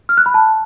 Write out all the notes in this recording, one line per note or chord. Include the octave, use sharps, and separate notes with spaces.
F6
F#6
B5
A5